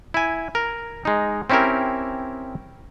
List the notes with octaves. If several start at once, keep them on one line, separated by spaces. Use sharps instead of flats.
E4 G#5
A#4
G#3 D#4
C4 C#4 E4 G4 A#4